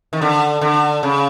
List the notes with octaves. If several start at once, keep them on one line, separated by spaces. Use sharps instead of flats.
D#3
D3
D3
C#3